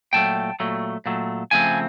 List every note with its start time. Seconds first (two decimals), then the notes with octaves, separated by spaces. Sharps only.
0.13 A#2 F#3 A3 G5 A5
0.60 A#2 F#3 A3
1.06 A#2 F#3 A3
1.51 C#3 F3 A3 C4 G#5